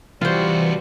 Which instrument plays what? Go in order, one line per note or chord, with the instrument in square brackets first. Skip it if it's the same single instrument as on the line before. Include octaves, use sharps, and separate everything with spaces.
[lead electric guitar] C3 F#4 [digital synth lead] E3 [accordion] G3 [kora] F4 C5